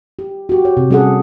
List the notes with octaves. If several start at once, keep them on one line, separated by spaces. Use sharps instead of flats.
G4
F#4 G4
C#5
C3
G3 C#4 G#4 A4 F#5